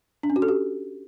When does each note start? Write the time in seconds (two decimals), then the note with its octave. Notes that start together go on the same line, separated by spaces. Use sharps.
0.23 D4
0.30 C#4
0.36 F#4
0.42 A4
0.48 G4